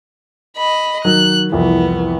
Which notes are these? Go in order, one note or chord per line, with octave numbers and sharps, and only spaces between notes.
D#5 B5
D#3 F#3 F#6
C2 F2 E3 B3